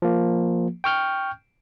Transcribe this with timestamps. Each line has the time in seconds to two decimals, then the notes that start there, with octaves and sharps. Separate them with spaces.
0.02 F3 A#3
0.84 G5 C#6 F6 G6